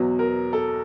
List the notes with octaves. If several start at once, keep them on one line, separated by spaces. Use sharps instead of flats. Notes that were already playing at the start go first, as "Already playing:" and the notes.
Already playing: E2 B2 F#3
A#4
A4